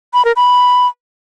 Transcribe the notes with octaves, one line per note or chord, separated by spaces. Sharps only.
B5
A#4
B5